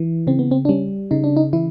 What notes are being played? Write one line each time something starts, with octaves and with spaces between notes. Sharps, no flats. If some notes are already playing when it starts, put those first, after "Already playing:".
Already playing: E3
C#3 C4
B3
C4
D4
G3 C#4
C#3 D#4
D4
D#4
E3 E4